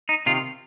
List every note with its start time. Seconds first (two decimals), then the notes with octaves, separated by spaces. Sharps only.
0.09 D#4
0.26 C3 D#3 F4